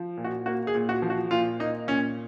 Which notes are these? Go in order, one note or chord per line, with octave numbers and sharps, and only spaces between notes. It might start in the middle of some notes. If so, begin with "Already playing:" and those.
Already playing: F3
A#2
F#4
A#3 F#4
G#4
A#2
F#4
F3
F#4
A#2 F4
A#3 D#4
A#2 C#4